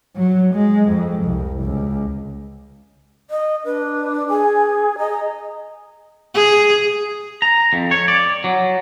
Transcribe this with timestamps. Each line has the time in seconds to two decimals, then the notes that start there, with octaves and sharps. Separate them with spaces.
0.16 F#3
0.54 G#3
0.88 F2
1.24 C2
1.62 C#2
3.30 D#5
3.65 D4 B4
4.29 G#4 G#5
4.98 D#5 A#5
6.35 G#4
7.42 A#5
7.73 F2
7.91 C#5
8.08 D5
8.44 F#3